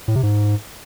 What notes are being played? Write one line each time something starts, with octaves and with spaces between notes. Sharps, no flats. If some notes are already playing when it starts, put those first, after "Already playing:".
A2
C3
G#2